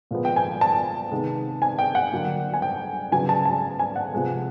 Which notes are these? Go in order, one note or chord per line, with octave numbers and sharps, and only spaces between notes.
A#2 F3 G#3 B3
G5
G#5
A5
C3 D#3 G#3 B3
G#5
G5
F#5
D3 F#3 A#3
G#5
G5
C#3 F#3 B3 G#5
A5
A5
G#5
F#5
C3 F3 G#3 B3